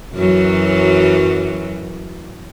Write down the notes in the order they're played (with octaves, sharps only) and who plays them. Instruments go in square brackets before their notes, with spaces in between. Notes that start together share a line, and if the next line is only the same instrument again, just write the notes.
[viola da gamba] F#2 E3 F#3